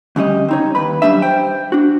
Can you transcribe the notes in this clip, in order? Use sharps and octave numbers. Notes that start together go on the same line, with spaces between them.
D2 C#3 G3 D#5
C4 D#4 C#5
D#2 B4 B5
F#2 F3 G3 D4 E5
C5 G5
D4 F#4